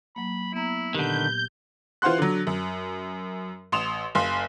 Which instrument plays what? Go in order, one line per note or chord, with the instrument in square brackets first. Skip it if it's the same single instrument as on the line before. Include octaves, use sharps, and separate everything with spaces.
[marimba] F#3 A#3 [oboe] B5
[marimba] B3 A#5 [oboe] E4
[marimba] A#2 G4 [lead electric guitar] D3 D#3 [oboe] B4 [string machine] G6
[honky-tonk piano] E3 F4 C5 F#5 C6 F#6
D3 F#3
F#2
A1 C6 D#6 E7 F7
F#1 F5 C6